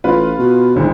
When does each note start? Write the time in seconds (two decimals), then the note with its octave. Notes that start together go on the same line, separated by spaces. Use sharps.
0.04 A1 F4 B4
0.39 B2
0.76 G#1 D2 G#2 E3